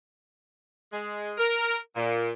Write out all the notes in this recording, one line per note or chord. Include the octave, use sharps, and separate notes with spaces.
G#3
A#4
A#2